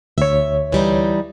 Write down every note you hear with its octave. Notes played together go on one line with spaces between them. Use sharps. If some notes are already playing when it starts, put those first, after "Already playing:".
D2 C#5 E5
E3 G3 D#4